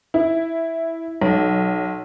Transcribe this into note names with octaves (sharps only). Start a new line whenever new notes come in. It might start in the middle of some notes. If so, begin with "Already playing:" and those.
E4
B1